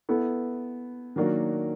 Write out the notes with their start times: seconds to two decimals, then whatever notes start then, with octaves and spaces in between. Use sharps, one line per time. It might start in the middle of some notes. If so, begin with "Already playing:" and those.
0.09 B3 E4 A4
1.16 D#3 F#3 A#3 D4 F#4